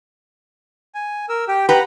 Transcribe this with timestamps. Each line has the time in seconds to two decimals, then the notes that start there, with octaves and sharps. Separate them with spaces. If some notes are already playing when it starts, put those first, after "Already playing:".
0.95 G#5
1.29 A#4 E6
1.48 G4 G5
1.69 G4 B4 F#5 A#5